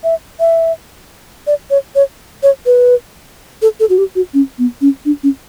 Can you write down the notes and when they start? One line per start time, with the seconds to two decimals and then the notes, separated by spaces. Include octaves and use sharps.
0.04 E5
0.40 E5
1.47 D5
1.70 C#5
1.95 C#5
2.43 C#5
2.66 B4
3.62 A4
3.80 A4
3.90 F#4
3.98 G4
4.15 F#4
4.34 C#4
4.58 B3
4.81 C#4
5.05 D4
5.23 C#4